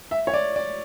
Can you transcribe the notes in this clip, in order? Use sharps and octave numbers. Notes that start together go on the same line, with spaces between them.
E5
C#5
D5
D5